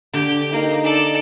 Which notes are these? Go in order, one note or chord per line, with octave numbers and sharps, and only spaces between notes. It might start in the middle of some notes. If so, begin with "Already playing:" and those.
D3 G4
A#3 D#4 G5
A4 D5